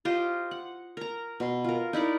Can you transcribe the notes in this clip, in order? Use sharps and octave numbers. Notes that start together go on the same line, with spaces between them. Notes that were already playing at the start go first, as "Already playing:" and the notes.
F4 G4 C5 D#5
F#5
A#4 A#5
B2 C6
F4 A#4
D#4 E4 A#4 D5